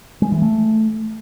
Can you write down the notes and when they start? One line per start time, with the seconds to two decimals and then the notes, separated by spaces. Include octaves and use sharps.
0.22 G#3
0.32 E3
0.42 A3